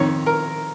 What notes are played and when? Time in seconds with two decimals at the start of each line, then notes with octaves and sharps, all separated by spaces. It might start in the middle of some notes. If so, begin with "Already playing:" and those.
Already playing: F2 D#3 C#5
0.26 A#4